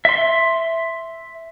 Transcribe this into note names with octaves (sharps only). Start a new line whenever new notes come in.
E5 C6